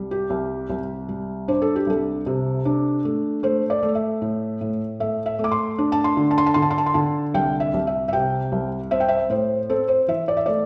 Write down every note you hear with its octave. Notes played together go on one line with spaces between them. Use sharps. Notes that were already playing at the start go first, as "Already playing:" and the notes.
Already playing: C2 G3
G4
C2
C2
G3
D4 C5
A4
G4
C2 A4
C3
D4
A3
A3 C5
D5
A3
E5
A2
A2
A3 E5
E5
A3
D6
C6
D4
A5
C6
D3
A5
C6
A5
D3 C6
A5
C6
A5
C6
D3 A5
C2 G5
E5
C2
E5
E5
C3 G5
C2
C4 E5
G5
E5
A2 C5
C4 A4
C5
E3 E5
D5
E5
A3 D5